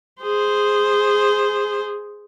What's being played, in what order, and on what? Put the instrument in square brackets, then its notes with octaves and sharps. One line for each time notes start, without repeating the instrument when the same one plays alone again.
[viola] G#4 C5